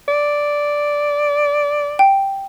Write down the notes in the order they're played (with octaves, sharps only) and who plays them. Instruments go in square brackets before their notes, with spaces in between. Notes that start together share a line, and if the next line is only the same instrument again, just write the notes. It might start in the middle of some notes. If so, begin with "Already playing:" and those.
[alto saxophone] D5
[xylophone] G5